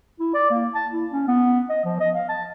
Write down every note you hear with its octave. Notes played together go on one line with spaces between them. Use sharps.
E4
D5
A#3
A5
E4
C#4
B3
D#5
F3
D#5
F5
A5